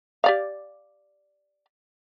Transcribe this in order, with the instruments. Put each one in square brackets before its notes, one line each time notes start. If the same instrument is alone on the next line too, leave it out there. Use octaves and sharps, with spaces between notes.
[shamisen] G4 D5 F5